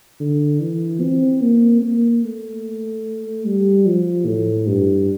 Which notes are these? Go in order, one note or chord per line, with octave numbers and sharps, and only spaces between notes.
D3
E3
C4
A#3
A#3
A3
G3
F3
A2
G2